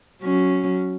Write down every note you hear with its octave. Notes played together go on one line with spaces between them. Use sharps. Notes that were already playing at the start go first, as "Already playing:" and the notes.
F#3 C#4